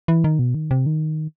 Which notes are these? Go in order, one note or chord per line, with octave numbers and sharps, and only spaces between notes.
E3
D#3
B2
D#3
C3
D#3